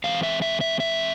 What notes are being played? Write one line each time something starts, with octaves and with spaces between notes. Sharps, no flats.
E3 G#3 C4 F5
E5
E5
E5
E5